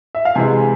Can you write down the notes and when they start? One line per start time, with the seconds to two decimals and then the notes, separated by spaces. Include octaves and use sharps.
0.15 E5
0.25 F5
0.35 C3 E3 G#3 G#5